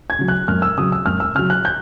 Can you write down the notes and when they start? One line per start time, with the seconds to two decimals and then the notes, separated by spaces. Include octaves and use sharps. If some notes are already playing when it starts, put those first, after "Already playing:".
0.10 G#6
0.19 C#3 F#3
0.28 F#6
0.48 F#2 F6
0.62 E6
0.77 C#3 F#3 D#6
0.92 E6
1.06 F#2 F6
1.20 E6
1.35 C#3 F#3 F6
1.50 F#6
1.65 G6